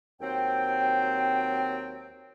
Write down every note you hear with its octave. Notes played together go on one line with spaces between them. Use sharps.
D#2 F#3 C4 C5 G5